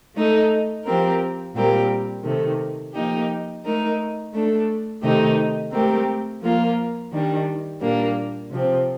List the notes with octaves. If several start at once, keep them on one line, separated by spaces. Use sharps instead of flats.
A3 D#4 A4
F3 C4 G4 A#4
A#2 G3 C4 G4 A#4
C3 D#3 A3
F3 A#3 D#4 G4
A3 D#4 A#4
A3 D4 A4
C3 D#3 A3 D#4 G4
A3 C4 G4 A#4
F3 A#3 F4 A#4
D#3 G3 D4
A#2 G3 A#3 D4
C3 F3 C4